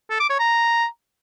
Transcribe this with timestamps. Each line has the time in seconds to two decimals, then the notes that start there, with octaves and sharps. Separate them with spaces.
0.10 A4
0.20 D6
0.30 C#5
0.39 A#5